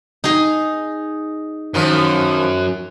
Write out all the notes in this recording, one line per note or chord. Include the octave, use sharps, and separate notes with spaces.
D#4 G#4
F#2 D#3 F3